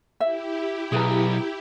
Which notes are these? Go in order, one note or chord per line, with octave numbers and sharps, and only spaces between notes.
E4 G4 E5
B1 G#4 B4 A#5